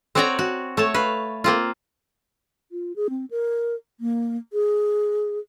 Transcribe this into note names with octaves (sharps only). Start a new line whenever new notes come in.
C4 F#4 C#5 D5 G5 A#5
F#4
A3 C#5 A5
B4 F5
A#3 C4 F4
F4
G#4
C4
A#4
A#3
G#4